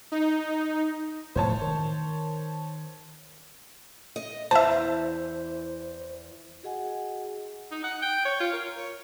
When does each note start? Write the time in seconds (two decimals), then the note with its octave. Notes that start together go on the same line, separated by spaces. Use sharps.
0.12 D#4
1.36 E1 A2 F3 C5 C#5 A5
1.61 D#3
4.16 D#5
4.51 E2 E3 C5 E5 A5
6.63 F#4 G#4 D#5 F#5 G#5
7.72 D#4
7.84 F#5
8.02 G5
8.25 C#5
8.40 F4
8.53 A#4
8.77 C#5